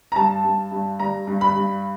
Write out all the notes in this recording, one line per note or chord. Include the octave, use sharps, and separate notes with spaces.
A#5
G2 A5
G2
G2
G3 A#5
G2
B5
G2